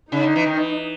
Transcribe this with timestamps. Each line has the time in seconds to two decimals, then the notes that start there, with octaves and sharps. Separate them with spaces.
0.12 C#3 D#4
0.24 D3
0.36 E3
0.46 D#3
0.57 E3